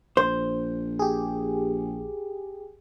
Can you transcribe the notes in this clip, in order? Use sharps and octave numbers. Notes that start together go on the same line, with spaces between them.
A#1 C5
G4 G#4